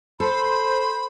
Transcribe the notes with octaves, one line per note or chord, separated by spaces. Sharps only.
A4 C5 B5